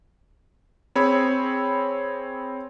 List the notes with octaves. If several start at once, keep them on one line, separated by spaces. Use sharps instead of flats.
C4 G#4 C#5 B5 E6